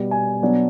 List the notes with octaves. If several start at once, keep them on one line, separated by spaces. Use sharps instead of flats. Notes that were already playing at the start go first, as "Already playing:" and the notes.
Already playing: B2 G3 B3
G#5
B2 F#3 B3 D4